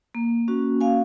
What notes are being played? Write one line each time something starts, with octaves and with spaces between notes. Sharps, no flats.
A#3
C#4 F#4
A#3 F5 G#5